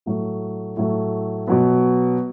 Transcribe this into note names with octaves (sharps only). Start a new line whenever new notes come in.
A2 F#3 A3
A2 F#3 A3
B2 F#3 B3